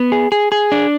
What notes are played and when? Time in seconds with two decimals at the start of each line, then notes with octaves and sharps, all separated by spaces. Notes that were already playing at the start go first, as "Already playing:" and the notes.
Already playing: B3
0.12 G#4
0.32 G#4
0.52 G#4
0.72 D4